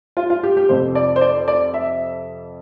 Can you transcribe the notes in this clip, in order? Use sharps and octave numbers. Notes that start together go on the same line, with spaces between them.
F4
F4
G4
G4
F2 C3 F3 C5
D5
C5
D5
D5
E5